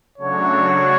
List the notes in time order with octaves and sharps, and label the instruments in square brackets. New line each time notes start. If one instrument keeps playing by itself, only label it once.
[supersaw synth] C#3 F#3 A3 D4 F#4 [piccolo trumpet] C#5